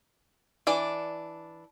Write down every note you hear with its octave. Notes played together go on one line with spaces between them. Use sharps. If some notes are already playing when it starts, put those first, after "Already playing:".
E3 D4 D5